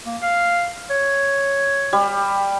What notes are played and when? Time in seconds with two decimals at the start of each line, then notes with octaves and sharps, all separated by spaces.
0.06 A#3
0.22 F5
0.90 C#5
1.93 G3